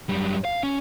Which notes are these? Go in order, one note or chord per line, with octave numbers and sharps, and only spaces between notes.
F#2 G3
F5
C#4